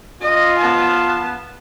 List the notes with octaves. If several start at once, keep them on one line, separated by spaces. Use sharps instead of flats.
F4 D#5
B3 A5